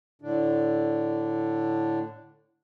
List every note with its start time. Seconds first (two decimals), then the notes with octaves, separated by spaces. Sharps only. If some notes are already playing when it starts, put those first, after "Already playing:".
0.22 A2 D3 D4